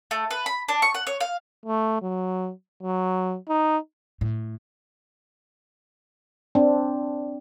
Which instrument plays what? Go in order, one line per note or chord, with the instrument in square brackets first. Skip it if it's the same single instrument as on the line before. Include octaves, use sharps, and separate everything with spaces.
[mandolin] A3
B4
B5
D4
C#6
F#5
C#5
F5
[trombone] A3
F#3
F#3
D#4
[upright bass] A2
[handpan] C4 D4